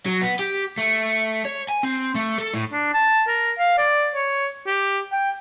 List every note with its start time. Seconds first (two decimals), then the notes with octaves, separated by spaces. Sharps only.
0.06 F#3
0.21 B3
0.39 G4
0.78 A3
1.45 C#5
1.69 G#5
1.83 C4
2.15 A3
2.38 A4
2.54 A2
2.73 D4
2.94 A5
3.28 A#4
3.59 F5
3.78 D5
4.15 C#5
4.67 G4
5.12 G5